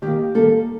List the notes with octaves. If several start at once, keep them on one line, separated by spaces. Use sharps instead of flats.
D#3 A#3 G4
D#3 G3 A#3 A4